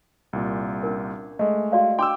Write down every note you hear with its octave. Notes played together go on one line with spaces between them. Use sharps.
C2 A#2
C#4 D4 A#4
G#3 A3 D#5
F#4 D5 F5
D4 G5 C6 D6 E6